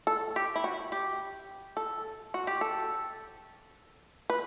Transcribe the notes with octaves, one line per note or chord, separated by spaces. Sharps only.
A4
G4
E4
F#4
G4
A4
F#4
G4
A4
B4